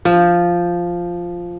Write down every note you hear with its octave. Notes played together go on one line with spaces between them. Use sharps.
F3